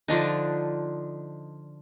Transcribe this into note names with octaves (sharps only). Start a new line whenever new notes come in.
D3 F3 D4 D#4